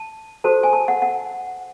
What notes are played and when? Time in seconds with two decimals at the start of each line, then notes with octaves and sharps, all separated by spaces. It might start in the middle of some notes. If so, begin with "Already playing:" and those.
Already playing: A5
0.44 F#4 A4 C5 A5
0.63 G#5
0.73 A5
0.88 F#5
1.02 F#5